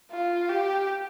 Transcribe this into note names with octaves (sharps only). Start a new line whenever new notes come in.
F4
G4